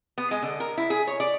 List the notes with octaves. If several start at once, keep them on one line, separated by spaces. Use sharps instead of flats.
B3
G#3
D3
A#4
E4
G#4
C#5
D5